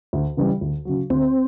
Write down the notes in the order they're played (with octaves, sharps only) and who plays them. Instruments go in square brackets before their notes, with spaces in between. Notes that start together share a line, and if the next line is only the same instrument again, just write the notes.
[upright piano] D2
C#3 E3 G3
D2
C#3 F#3
[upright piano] D2 [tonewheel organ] C4